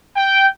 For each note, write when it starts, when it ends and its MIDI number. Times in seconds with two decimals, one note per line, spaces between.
0.15 0.46 79